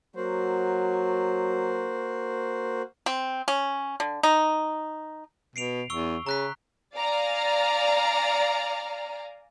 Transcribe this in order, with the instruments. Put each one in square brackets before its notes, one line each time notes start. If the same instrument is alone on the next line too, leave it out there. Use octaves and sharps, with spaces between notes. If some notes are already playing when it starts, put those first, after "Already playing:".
[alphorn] F#3 [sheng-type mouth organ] A#3 F#4 C5
[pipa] C4
C#4
D3
D#4
[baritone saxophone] B2 [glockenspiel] C7 D7 F7
[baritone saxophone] E2 [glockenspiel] C#6 E6 G7
[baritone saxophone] C#3 [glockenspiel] A#5 F#6 B6
[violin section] D5 F5 G#5 A#5 F6